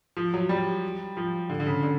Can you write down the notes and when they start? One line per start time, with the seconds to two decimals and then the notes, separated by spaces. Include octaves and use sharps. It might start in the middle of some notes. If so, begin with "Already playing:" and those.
0.17 F3
0.34 F#3
0.49 G3
1.17 F3
1.50 D3
1.60 D3
1.67 C#3
1.83 D3